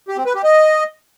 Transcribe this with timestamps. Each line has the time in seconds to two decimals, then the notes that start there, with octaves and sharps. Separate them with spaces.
0.08 G4
0.17 C4
0.26 B4
0.35 G4
0.44 D#5